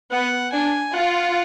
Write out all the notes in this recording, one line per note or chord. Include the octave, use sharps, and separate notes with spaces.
B3 F#5
D4 G#5
F4 F#5